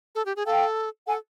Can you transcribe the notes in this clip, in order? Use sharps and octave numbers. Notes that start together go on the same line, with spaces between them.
A4
G4
G#4
A4 F5 G5
A4 F#5 G#5